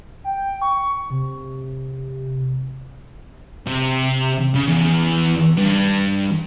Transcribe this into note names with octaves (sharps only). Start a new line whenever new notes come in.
G5
C#6
C3
C3
C#3
E2
G2